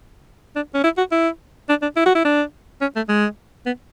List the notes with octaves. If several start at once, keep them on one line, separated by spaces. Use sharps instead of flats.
D4
C#4
E4
F#4
E4
D4
D4
E4
F#4
E4
D4
C#4
A3
G#3
B3